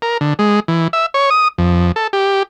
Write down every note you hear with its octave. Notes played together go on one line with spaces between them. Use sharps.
A#4
D3
G#3
E3
E5
C#5
D#6
F2
A4
G4